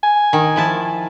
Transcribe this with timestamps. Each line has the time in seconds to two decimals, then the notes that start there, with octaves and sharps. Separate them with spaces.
0.03 G#5
0.33 D#3
0.56 F3 E4 A5